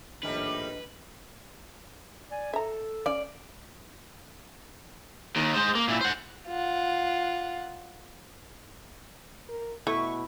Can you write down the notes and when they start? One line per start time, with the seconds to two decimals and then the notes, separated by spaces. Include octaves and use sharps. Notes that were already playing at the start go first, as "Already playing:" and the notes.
0.23 A#1 A2 D#3 G3 D4 A#4 B4 D#5
2.31 D5 G#5
2.54 A4 E5 A#5
3.06 C#4 D5 F5
5.36 D#2 D#3
5.54 G#3 C5
5.75 A#3
5.88 A#2 E4
6.01 C5 F#5
6.48 F4 F#5
9.49 A#4
9.87 B2 A3 E4 B4 C#6